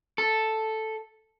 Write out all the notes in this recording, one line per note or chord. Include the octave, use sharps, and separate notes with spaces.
A4